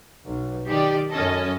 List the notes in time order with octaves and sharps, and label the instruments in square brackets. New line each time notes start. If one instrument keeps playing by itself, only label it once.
[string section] B1
D#3 G4 D5
F#2 C#4 A4 D#5